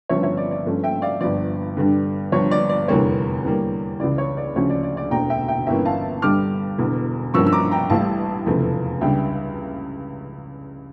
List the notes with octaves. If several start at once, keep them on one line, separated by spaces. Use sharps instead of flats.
G1 G2 F3 C#4 C#5 E5
C#5 E5
D5
D5
G2 F3 A3 C#4
E5 G5
D5 F5
G1 G2 F3 D5
G2 D3 G3 D4
G1 G2 F3 C#5
D5
D5
F1 E2 D3 G3 A#3 C#5
E2 D3 G3 A#3
C#2 C#3 E3 D5
C#5
D5
D2 C#3 F3 C#4 C#5
D5
D5
D5
E1 D2 D3 G5 A#5
E5 G5
E5 G5
G1 G2 E3 A#3 C#4 E5 G5
F5 A5
G2 D3 G3 D6 F6
E1 E2 D3
G2 F3 A#3 C#4 C#6 E6
E6
A#5 D6
G5 A#5
A1 A2 G3 F5 A5
F1 E2 C#3 F3 A3
C#2 C#3 G3 D4 E5 G5